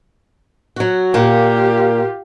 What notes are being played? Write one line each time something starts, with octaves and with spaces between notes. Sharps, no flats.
F#3 F#4
A#2 A#3 F4 G4